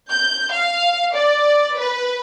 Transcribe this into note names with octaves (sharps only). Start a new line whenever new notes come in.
G6
F5
D5
B4